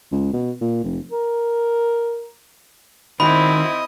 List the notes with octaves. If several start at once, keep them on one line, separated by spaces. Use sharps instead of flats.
C#2
B2
A#2
F1
A#4
D#3 C4 E4 F#4 D#5 B5